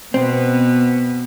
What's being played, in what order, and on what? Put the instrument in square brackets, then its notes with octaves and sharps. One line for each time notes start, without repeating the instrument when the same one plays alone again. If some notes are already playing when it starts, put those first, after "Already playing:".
[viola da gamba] B2 B3 [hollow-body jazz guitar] C4